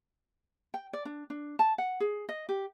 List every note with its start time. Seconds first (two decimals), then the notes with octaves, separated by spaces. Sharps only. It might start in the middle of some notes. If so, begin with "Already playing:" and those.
0.74 G5
0.93 D5
1.05 D4
1.30 D4
1.59 A5
1.78 F#5
2.00 G#4
2.29 D#5
2.49 G4